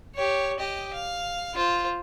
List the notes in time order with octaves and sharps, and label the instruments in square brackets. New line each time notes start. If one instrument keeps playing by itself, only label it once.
[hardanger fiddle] G4 C#5
G4 D#5
F5
F4 C5